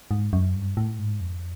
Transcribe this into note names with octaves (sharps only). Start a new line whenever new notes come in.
G#2
F#2
G2
A2
G#2
F2